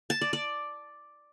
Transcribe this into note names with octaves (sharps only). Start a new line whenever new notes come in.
A5
D5
D5